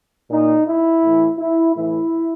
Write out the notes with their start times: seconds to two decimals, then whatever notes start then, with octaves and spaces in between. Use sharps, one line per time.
0.30 A#2 D#4
0.66 E4
1.03 A2 E3
1.38 E4
1.75 A2 E3 E4